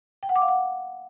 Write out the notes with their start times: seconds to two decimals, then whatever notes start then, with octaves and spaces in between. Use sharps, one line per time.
0.23 G5
0.29 F#5
0.36 D6
0.42 F5
0.48 F#5